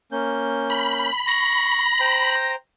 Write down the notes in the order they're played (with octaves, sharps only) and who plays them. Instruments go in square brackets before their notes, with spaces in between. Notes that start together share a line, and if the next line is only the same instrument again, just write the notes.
[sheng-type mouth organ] A#3 C#4 G6
[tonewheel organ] B5
[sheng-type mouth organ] C#6 [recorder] A#6
[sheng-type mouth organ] C5 G5 A#5